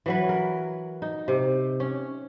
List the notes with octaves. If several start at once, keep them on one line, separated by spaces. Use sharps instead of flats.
E3 F#3 B4
A#4
D#4
C3
C#4